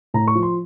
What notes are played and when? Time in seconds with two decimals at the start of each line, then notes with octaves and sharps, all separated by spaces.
0.14 A2 A#5
0.28 C#6
0.35 F3
0.43 C6